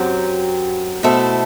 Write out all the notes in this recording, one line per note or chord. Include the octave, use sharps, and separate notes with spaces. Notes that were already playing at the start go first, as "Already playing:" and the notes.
Already playing: F#2 F#3 C4 G4
B2 A3 E4 A4 C5